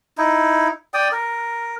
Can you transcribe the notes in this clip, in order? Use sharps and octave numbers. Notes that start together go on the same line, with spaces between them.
D#4 E4
D5 G5 D#6
A#4